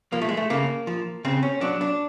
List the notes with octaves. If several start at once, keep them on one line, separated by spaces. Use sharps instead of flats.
F3 A#3
A3
G#3
A3
C#3 A#3
F3
C#3 C4
C#4
F#3 D4
D4